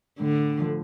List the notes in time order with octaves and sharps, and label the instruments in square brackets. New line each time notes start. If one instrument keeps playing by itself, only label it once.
[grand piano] A2 [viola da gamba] D3
[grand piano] F3 A3